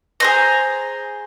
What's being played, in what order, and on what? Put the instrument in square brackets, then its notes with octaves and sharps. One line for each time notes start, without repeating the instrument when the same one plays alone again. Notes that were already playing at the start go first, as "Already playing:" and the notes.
[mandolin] G#4 C5 A#5